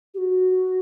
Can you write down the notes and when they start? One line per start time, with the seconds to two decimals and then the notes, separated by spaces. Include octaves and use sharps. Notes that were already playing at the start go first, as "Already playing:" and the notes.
0.14 G4
0.18 F#4